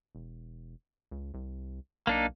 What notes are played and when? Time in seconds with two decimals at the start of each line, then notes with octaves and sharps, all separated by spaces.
0.15 E1
1.11 C#2
1.34 C2
2.07 B1 A#3 D4 D#4